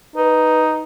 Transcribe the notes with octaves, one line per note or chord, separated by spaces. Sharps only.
D#4 B4